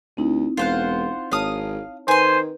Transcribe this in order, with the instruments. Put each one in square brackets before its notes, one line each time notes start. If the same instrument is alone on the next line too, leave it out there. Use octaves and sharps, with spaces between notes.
[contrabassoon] D2 [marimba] C4 D#4 E4
[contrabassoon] E1 [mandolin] F4 C5 F#5
[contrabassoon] G#1 [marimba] C#5 A5 [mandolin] F5 D#6
[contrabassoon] D#3 [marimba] B4 G6 [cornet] C5 [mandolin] G#5 C6